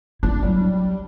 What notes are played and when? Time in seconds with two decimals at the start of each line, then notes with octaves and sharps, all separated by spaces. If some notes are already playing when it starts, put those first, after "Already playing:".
0.23 D4 E4
0.43 F#3 G3